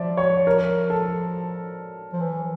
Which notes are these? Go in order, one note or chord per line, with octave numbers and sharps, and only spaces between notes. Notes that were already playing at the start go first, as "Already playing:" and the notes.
Already playing: F3 D5 E5
C#5
A#4
A4
F3
E3